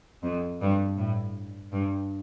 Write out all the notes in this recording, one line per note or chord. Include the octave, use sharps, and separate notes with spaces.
F2
G2
A2
G2